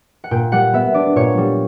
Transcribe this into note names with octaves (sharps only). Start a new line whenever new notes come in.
F#5
A#2 G5
G3 F#5
B3 E5
D4 D5
A#2 C#5
G3